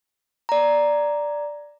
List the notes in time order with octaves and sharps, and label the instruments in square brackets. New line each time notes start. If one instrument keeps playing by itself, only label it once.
[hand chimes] D5 A#5